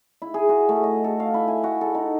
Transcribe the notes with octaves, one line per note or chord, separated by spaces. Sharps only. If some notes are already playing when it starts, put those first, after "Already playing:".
E4
G#4
F#4
A3
D#5
A4
F5
E4
G#5
F#4
A4
D#4